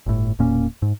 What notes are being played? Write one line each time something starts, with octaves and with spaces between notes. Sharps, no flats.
G1 A2
E1 A#2 A#3 C#4
G#2